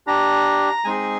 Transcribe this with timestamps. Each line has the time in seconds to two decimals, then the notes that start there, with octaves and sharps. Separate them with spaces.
0.07 D4 G4 A#5
0.84 G#3 C4 D#4 G#4 G#5